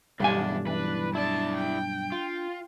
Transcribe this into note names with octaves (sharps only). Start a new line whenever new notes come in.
B1 E2 G2 G3 D4 G#5
E3 D4 B4
D4 E4 D5 A5
G5
F4